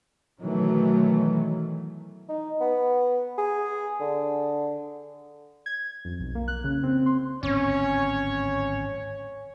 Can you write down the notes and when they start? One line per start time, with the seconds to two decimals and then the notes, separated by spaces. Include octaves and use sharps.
0.40 B2 D#3 E3 F#3 A3
2.29 D#4
2.61 B3
3.38 G#4
4.01 D3
5.66 G#6
6.05 F2
6.20 B1
6.35 A#3
6.48 F#6
6.64 C#3
6.83 C4
7.06 C6
7.43 D1 G#1 C4 C#4 C#5